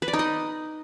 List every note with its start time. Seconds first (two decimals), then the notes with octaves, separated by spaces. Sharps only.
0.02 B4
0.08 D5
0.13 D#4
0.19 D#5